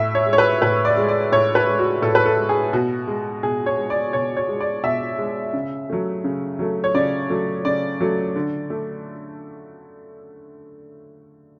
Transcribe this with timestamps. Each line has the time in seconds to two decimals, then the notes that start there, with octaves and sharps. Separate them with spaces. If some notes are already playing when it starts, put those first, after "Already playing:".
Already playing: A2 E5
0.15 C#5
0.27 G#3
0.33 C#5
0.38 B4
0.62 A2 B4
0.85 D5
0.97 G#3
1.08 D5
1.32 A2 C#5
1.55 B4
1.67 G#3
1.79 F#4
2.02 A2 A4
2.15 B4
2.26 A4
2.37 G#3
2.49 G#4
2.73 B2 F#4
3.08 G#3
3.43 B2 G#4
3.66 C#5
3.78 G#3
3.90 D5
4.13 B2 C#5
4.37 C#5
4.49 G#3
4.60 D5
4.83 B2 E5
5.19 G#3
5.53 C#3
5.90 F#3 A3
6.24 C#3
6.59 F#3 A3
6.84 C#5
6.95 C#3 D5
7.30 F#3 A3
7.65 C#3 D5
8.01 F#3 A3
8.36 D3
8.70 A3